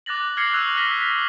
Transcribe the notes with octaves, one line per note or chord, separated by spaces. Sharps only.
D6 F#6 A6 A#6 F#7
F6 G#6 A#6 C7 C#7 F#7
C#6 E6 F#6 F7 F#7
F6 A#6 B6
A#6 B6